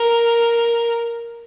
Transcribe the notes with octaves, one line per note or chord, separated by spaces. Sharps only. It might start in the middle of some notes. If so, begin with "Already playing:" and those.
Already playing: A#4